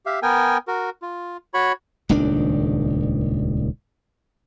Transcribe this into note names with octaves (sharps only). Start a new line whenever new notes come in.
G4 E5 F5
B3 A#4 G5 G#5
F#4 A#4
F4
F#4 C#5 B5 C#6
D#1 C#2 D#3 D4